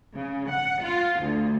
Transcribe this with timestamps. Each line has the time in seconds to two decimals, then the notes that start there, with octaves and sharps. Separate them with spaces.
0.16 C#3
0.49 F#5
0.83 F4
1.21 D2